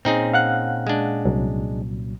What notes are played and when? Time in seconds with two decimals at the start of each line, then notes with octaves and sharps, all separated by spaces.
0.05 A#2 C4 C#4 D#4 G#4
0.34 F5 F#5 F#6
0.87 G#3 D4
1.25 C2 F#3